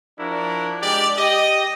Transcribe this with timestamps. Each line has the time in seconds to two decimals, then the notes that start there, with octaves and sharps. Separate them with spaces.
0.18 F3 D4 E4 F#4 A#4
0.81 G#3 D4 G4 D5
1.17 G4 D#5